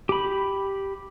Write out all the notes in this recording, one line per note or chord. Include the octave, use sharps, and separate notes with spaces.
G4 B5